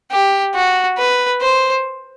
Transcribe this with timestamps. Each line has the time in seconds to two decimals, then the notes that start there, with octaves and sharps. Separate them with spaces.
0.11 G4
0.55 F#4
0.98 B4
1.41 C5